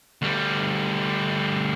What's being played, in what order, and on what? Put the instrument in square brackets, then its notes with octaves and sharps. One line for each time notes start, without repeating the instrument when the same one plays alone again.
[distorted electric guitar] D2 G3